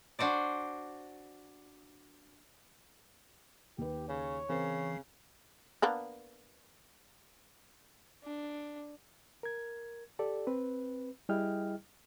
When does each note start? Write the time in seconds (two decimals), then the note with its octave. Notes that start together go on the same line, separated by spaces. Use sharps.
0.19 D4 F#4 C5 D5
3.78 D#2 G4 B4
4.09 C#3 C#5
4.49 C#3 E3 C4 A#4 C5 C7
5.82 A#3 B3 D4
8.24 D4
9.43 A#4 G#6
10.19 G4 A4 D5
10.47 C4 B4
11.29 G3 E4 G#4 D#5 G5 F6